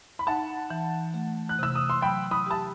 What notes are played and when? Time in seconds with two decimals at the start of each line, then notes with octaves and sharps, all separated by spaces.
0.19 B5
0.27 D#4 F#5 A5
0.70 E3
1.14 A3
1.49 F#6
1.59 C3 E6
1.75 D#6
1.90 C6
2.01 F#3 G5 B5
2.31 B5 D#6
2.46 G4 A5